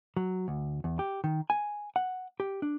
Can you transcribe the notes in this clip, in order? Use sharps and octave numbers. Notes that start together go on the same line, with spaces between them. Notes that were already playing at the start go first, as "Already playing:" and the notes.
F#3
D2
E2
G4
D#3
G#5
F#5
G4
D4